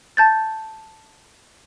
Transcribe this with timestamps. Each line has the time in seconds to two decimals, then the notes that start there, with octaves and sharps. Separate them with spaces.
0.17 A5 G6 A6